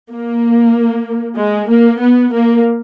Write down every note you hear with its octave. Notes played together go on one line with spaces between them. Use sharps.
A#3
G#3
A#3
B3
A#3